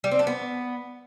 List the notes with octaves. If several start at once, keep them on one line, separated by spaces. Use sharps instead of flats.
G3
C4
D4
B3